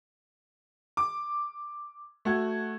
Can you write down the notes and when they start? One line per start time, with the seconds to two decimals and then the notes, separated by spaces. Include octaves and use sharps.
0.97 D6
2.25 A3 F#4 G#6